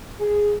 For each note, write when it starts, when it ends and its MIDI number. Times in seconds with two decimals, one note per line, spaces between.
0.20 0.54 68